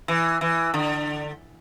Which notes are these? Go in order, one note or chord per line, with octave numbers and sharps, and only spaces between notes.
E3
E3
D3